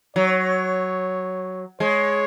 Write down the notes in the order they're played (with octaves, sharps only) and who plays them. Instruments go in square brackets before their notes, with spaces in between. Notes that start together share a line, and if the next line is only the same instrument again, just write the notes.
[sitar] F#3 [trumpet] C#5
[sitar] G#3 [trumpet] C#5